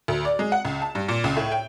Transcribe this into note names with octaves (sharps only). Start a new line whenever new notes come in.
D2
D5
G#3
F#5
C#2
A5
G2
A#2
C#2
A2
G5